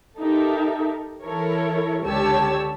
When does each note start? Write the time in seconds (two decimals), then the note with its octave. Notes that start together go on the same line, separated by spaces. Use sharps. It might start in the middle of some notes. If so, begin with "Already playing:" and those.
0.19 D#4 G4 A4 A#4 E5
1.24 E3 E4 A4 A#4 C#5
2.03 C#2 D3 G4 C#5 A5 E6